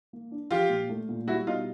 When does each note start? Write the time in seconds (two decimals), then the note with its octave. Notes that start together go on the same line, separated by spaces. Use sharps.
0.13 A#3
0.31 D4
0.51 F3 F4 G4
0.70 A#2
0.89 A3
1.09 A#2
1.27 G3 E4 F#4
1.47 B2 D#4 F4